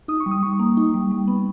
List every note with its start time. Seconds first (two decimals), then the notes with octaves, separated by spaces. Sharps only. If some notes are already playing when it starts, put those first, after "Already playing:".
0.08 D#4 D#6
0.20 C#6
0.26 G3
0.31 D#6
0.43 G3 C#6
0.59 A#3
0.77 D#4
0.94 G3
1.11 G3
1.28 B3